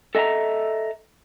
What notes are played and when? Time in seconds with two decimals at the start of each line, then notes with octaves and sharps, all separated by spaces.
0.15 A4 D#5 E5 G#5 A#5